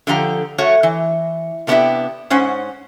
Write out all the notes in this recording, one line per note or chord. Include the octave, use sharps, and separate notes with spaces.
D3 F3 G4 A#5
A3 F#4 C#5
E3
C3 A3 B3 D4 E4 G4
G#2 C#4 C5 F#5